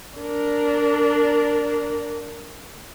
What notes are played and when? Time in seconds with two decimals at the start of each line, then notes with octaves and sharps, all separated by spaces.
0.18 D4 A#4